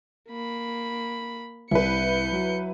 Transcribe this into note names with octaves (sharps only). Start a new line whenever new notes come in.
A#3 B5
C2 E4 B4 G6 C#7
F#3